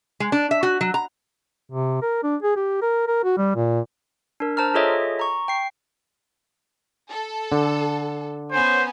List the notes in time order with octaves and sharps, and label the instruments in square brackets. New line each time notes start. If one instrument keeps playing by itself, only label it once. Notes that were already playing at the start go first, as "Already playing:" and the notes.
[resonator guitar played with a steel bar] G#3
D4
E5
F#4
F#3
A#5
[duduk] C3
A#4
D4
G#4
G4
A#4
A#4
F#4
G3
A#2
[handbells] D4 A#4
C5 A5 A#5 F6
F4 G#4 A4 C#5 D#5 E5
A#5 C#6
G5 C7
[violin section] A4
[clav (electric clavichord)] D3
[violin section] B3 C#4 G#5 [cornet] C5